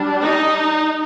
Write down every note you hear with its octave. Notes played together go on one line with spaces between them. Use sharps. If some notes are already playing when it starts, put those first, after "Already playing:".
Already playing: G3 D4
D#4